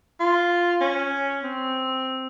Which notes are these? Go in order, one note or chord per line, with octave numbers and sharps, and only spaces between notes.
F4
C#4
C4